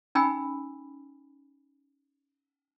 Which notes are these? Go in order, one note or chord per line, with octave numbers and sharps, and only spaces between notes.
C#4 D#4 G5 G#5 B5 E6